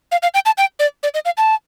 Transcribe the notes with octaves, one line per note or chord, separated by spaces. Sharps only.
F5
F5
G5
A5
G5
D5
D5
D#5
F5
A5